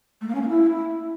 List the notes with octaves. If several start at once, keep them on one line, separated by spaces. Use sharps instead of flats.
A3
A#3
C#4
A#3
E4